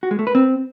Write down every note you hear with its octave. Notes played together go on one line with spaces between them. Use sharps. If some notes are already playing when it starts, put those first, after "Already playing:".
F#4
G#3
A3
B4
C4